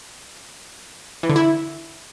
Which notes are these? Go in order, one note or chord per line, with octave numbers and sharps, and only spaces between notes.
E3
D3
E4